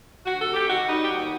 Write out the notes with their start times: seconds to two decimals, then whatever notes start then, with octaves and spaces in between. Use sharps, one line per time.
0.25 D2 F#4
0.39 A4
0.46 C3
0.53 G4
0.67 D#3 F#4
0.88 G3 D#4
1.02 G4
1.09 D#2 F#4